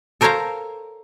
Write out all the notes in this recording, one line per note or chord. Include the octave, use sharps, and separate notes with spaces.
A4 A#4 C5 C#5 F5 A#5